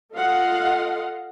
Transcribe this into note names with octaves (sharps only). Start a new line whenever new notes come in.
F4 A4 D#5 F5 F#5